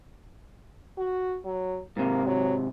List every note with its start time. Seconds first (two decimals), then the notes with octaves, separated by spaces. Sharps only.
0.97 F#4
1.45 F#3
1.97 G#2 C3 A#3
2.27 F#3